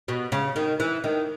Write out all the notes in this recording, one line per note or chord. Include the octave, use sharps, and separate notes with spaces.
B2
C#3
D#3
E3
D#3